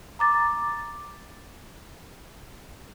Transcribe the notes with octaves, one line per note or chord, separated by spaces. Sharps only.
A#5 D6 A6